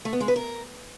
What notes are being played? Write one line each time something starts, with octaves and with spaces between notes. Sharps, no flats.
A3
B3
G#3
B4
A#4